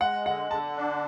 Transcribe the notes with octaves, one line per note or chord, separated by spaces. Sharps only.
G#3 F#5
D3 F#5
D3 A5
D4